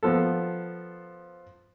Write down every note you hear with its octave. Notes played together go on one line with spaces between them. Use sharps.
F3 B3 A4